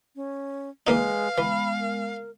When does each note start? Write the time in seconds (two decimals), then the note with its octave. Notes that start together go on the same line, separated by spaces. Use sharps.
0.15 C#4
0.87 E3 G#3 A#3 D#4 B4 F5
1.38 E3 G#3 B3 B5
1.80 A#4